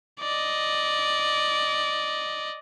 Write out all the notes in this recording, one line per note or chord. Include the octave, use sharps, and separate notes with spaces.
D5 D#5